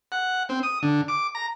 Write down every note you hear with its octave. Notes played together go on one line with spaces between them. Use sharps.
F#5
C4
D#6
D3
D6
A#5